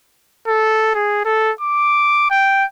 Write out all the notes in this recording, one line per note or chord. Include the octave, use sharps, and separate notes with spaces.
A4
G#4
A4
D6
G5